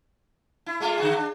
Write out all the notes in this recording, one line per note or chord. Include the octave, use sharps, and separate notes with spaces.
E4
G#3 A3 F4
D3 F#4 G#4
D4